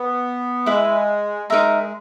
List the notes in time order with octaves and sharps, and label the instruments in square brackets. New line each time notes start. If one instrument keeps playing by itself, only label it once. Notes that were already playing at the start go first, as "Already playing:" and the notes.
Already playing: [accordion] B3
[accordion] G#3 [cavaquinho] E4 B4 E5
[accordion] G#3 [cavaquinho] D#4 A#4 E5 A#5